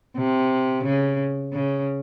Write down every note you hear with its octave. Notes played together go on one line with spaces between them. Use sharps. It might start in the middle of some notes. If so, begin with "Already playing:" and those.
C3
C#3
C#3